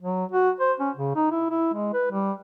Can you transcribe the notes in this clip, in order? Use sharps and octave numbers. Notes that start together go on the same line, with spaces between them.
F#3
F#4
C5
C#4
C#3
D#4
E4
E4
G#3
B4
G3